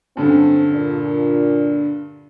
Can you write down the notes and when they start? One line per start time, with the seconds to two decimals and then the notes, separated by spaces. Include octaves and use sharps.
0.17 G2 D3 F#3 C4 C#4
0.73 A#2 D5